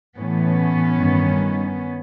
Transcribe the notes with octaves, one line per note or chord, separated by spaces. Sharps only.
A2 E3 B3 C#4
G2 D#3